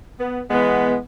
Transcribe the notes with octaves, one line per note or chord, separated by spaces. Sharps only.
B3
E3 G#3 B3